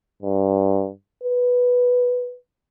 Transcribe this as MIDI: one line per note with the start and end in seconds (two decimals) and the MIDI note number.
0.23 0.89 43
1.23 2.36 71